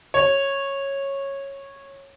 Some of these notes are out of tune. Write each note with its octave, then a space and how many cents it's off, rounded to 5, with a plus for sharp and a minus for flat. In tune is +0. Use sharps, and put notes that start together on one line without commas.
C#5 -10